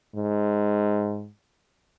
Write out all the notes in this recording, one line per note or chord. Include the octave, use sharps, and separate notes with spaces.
G#2